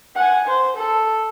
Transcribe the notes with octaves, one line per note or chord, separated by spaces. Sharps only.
F#5 G#5
C5
A4